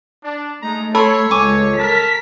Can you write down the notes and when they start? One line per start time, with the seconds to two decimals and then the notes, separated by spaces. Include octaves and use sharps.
0.24 D4
0.63 G#3 A3 D#4 A#5
0.95 A4 C#5 B5 C6
1.31 C#2 G#5 C#6 D6
1.79 A#4 A5 B6